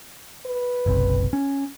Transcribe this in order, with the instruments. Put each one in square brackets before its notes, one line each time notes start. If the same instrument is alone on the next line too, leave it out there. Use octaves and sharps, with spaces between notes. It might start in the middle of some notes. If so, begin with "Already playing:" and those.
[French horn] B4
[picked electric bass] F#1 B1 C3
C#4